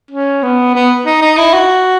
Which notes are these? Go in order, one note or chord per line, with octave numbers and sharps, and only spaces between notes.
C#4
B3
B3
D#4
D#4
E4
F#4